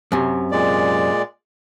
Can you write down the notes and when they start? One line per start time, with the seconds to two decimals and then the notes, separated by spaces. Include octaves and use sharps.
0.12 F#2 C3
0.51 A#2 G#3 D5